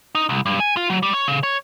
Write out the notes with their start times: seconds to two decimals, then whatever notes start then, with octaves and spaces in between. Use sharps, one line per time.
0.15 D#4
0.29 C2
0.46 G2
0.60 G#5
0.77 F4
0.90 F#3
1.03 G3
1.14 C#5
1.28 C#3
1.43 C#5